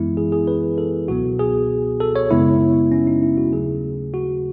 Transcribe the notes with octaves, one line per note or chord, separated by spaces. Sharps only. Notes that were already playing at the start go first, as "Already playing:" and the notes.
Already playing: F#2 E3 G#3 B3 E4
G#4
G#4
B4
A4
C#2 B2 F#3 B3 F#4
G#4
A4
C#5
F#2 C#3 G#3 B3 E4
C#4
D#4
E4
F#4
D#2 C#3 F#3 A3 G#4
F#4